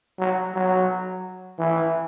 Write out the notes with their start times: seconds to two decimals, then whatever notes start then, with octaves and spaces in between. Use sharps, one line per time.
0.20 F#3
0.55 F#3
1.59 E3